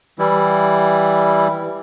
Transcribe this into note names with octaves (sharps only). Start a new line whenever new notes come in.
E3 G3 E4